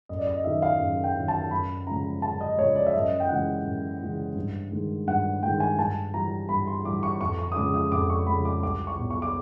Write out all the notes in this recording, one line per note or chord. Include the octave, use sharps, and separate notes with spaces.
F#2 D#5
D5
D#5
D#3 F#3 E5
F5
F#2
G5
D#3 F#3
A5
F#2 B5
C#3 F3 G#3 A#5
F#2 A5
D#5
C#3 F3 G#3 C#5
D5
E5
F#2 D#5
G5
C#3 E3 G#3 F#5
F#2
C#3 E3 G#3
G2
D#3 G#3
G2 F#5
D#3 G#3 G5
G#5
G2 A5
E3 G3 A#5
G2 B5
C6
E3 G3 D6
C#6
F2 C#6
C#6
D#6
C#3 F3 G#3 D6
D#6
F2 D6
C#6
C#3 F3 G#3 B5
D6
C2 D6
C#6
B2 F#3
C#6
D6